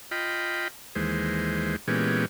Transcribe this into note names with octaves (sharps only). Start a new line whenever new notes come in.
F4 D#5 G5 B5
D#2 E3 G#3 C5
A#2 E3 G#3 B3 C#4 G4